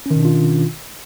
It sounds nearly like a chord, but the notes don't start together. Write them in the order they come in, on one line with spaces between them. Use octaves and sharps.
C#4 D#3 B2 D4 F4